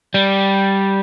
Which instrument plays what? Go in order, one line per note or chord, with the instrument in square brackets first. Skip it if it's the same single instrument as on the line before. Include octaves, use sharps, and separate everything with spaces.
[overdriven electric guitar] G3